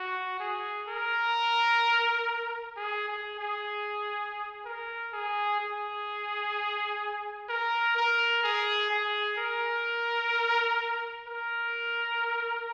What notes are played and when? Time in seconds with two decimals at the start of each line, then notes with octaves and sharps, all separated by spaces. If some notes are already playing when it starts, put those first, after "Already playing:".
Already playing: F#4
0.40 G#4
0.88 A#4
2.76 G#4
3.08 G#4
3.39 G#4
4.65 A#4
5.13 G#4
5.60 G#4
7.49 A#4
7.96 A#4
8.43 G#4
8.90 G#4
9.38 A#4
11.27 A#4